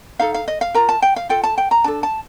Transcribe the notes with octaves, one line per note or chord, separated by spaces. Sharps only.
D#4 A4 F5
F5
D#5
F5
F4 A#4 A#5
A5
G5
F5
F4 A4 G5
A5
G5
A#5
D4 A4 A5
A5